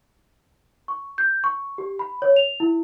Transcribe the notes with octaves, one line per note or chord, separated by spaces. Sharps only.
C#6
G6
C#6
G4
B5
C#5
F7
E4